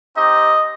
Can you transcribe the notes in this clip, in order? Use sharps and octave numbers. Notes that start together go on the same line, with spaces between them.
C4 D#4 G4 D#5